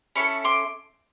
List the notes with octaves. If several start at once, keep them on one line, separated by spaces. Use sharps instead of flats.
C#4 E4 A4 B5 C#6
C6 D6